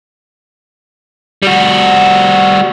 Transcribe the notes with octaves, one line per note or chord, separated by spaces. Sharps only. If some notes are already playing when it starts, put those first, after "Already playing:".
G3 F#4